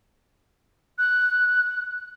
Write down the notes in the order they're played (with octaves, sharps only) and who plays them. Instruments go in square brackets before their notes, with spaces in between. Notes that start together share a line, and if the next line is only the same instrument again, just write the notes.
[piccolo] F#6